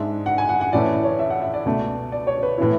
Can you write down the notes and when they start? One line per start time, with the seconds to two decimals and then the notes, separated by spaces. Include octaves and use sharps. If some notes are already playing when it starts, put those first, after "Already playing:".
Already playing: G#2 G#3 D4 E5
0.26 F#5
0.38 G#5
0.49 F#5
0.61 F#5
0.73 A2 E3 A3 C#4 D5
1.04 C#5
1.19 E5
1.30 F#5
1.42 E5
1.54 D5
1.65 C#2 B2 A3
2.12 D5
2.27 C#5
2.43 B4
2.58 A2 E3 B3 E4